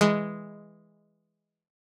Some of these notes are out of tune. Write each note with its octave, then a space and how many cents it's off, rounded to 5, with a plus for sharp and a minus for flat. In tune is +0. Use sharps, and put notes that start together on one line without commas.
E3 +0 G#3 -5